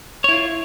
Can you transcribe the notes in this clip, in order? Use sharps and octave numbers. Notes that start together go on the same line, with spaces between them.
E4 F4 C#5